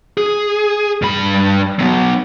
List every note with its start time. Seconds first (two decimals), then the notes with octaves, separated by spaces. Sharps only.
0.17 G#4
1.02 G2 B5
1.79 F#3 B3